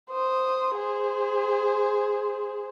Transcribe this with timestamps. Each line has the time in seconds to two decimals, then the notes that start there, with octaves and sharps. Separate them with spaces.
0.11 C5 D#6
0.77 G#4 C5